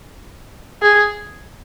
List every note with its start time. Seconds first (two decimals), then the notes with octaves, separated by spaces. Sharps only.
0.82 G#4